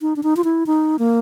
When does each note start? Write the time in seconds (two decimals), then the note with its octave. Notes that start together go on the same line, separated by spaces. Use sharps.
0.01 D#4
0.16 D4
0.23 D#4
0.37 F4
0.44 E4
0.66 D#4
0.99 A#3